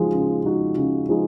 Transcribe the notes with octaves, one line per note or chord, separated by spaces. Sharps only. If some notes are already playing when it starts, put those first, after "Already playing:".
Already playing: C#3 F3 G#3 D#4 F#4
C#3
F3 G#3 D#4 F#4
C#3
F3 G#3 D#4